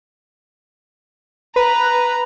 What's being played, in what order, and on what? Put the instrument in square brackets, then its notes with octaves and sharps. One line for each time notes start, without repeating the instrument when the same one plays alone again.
[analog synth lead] B4 [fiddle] A#5